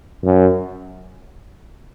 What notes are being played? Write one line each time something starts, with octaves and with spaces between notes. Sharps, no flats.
F#2